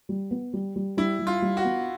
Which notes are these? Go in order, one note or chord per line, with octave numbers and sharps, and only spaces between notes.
G3
B3
G3
G3
G3 E4
G3
F4
G3
F#4
B3